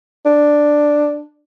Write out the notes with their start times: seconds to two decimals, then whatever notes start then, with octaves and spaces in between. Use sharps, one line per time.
0.25 D4